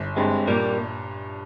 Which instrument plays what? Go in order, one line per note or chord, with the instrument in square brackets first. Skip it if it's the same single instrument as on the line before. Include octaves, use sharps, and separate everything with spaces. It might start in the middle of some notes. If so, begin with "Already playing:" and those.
Already playing: [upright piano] G1
[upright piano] G2 [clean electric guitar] G#3 C4
[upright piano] A#2 [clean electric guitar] G3 A#3